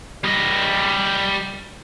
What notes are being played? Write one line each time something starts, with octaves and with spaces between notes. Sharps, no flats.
G3 D#5